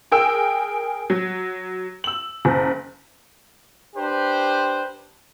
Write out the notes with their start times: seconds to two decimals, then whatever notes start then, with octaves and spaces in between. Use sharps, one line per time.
0.11 G#4 A#4 G5 E6
1.10 F#3
2.04 E6 F#7
2.45 F#1
3.96 D4 G4 B4 C5